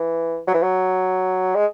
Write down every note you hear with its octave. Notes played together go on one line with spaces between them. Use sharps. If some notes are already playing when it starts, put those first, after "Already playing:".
Already playing: E3
F#3
E3
F#3
G#3